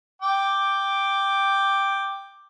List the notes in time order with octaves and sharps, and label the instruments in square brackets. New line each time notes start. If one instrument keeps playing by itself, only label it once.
[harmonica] G5 D6